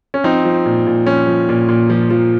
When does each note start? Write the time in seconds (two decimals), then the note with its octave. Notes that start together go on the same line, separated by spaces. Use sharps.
0.14 C#4
0.24 F3 C4 D#4
0.45 F3
0.65 A#2
0.86 A#2
1.06 F3 C#4
1.27 F3
1.49 A#2
1.68 A#2
1.90 F3
2.11 F3